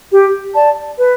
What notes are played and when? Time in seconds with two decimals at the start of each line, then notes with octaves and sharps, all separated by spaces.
0.10 G4
0.53 D5 A5
0.97 B4